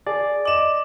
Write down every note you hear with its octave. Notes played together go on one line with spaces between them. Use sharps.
G#4 D5
D#5 D6 E7 F#7